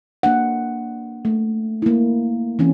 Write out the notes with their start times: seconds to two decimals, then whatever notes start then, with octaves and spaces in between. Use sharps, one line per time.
0.23 A#3 D4 F#5
1.25 A3
1.82 A#3 E4
2.59 E3 C4 C#4